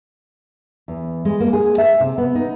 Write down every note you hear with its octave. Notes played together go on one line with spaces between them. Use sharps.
E2
G#3
A#3
G#4
E5
C3
B3
D#4